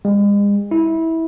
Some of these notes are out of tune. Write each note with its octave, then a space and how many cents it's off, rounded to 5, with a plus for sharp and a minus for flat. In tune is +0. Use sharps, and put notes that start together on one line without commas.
G#3 -40
E4 -20